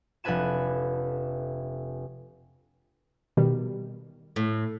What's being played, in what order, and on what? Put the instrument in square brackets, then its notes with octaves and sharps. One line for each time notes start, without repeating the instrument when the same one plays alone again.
[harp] F1 D4 A4 B4 G#5 E7
[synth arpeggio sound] B2 D#3 G3
[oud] A2